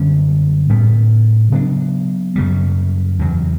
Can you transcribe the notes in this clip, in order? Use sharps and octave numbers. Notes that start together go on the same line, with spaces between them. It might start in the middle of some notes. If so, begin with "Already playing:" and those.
Already playing: F#2 D3 G3 C#4
A2 G3 B3
C#3 F#3 B3 D4
F#2 C#3 G3
E2 C#3 F#3